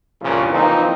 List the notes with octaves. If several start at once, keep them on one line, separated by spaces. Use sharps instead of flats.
C2 G2 A#2 C#3 F3
E3 F3 A#3 C4 D#4